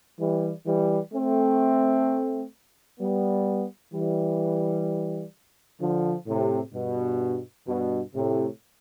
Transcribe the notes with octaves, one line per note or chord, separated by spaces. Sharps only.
E3 G3
E3 G3
A3 C4
G3 B3
E3 G3
D3 F3
A2 C3
G2 B2
G2 B2
A2 C3